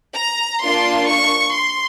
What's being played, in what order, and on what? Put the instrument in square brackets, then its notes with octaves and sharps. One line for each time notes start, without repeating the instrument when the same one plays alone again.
[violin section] A#5
A#3 D4 F4 C6
C#6
C6